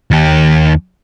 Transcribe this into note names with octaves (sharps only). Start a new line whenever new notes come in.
D#2 G4